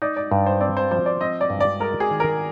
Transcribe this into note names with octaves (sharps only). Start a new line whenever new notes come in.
D#4 D5
D5
G2
C5
C4 D5
C5
F3 C5
D5
C4 D#5
D5
G2
D5
G#3 A#4
G#4
D#3
A#4